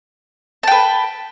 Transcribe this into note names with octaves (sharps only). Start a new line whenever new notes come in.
B4 G5 A5